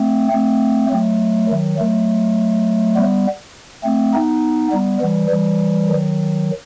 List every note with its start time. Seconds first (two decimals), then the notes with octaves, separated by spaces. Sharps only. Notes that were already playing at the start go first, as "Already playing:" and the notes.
Already playing: A3 C4
0.32 A3 C4
0.90 F#3 A3
1.49 D#3 F#3
1.79 F#3 A3
2.96 G3 B3
3.84 A3 C4
4.13 B3 D#4
4.72 G3 B3
5.01 E3 G3
5.31 E3 G3
5.89 D#3 F#3